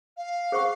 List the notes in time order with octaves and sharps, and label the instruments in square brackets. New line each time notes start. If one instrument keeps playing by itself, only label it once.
[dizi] F5
[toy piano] G#4 C5 F#5 C#6